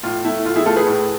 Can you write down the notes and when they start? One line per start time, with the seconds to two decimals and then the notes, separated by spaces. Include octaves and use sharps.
0.03 A2 F4
0.24 A3 E4
0.45 A2 F4
0.56 E4 G#4
0.66 A3 F4 A4
0.76 G#4 B4
0.87 A2